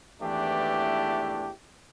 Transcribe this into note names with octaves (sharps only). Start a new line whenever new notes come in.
G#1 E2 E3 A3 D4 G4